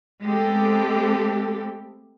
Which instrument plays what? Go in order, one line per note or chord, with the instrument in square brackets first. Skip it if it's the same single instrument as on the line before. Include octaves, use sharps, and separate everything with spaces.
[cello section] G#3 A3 B3 C4 G4 A4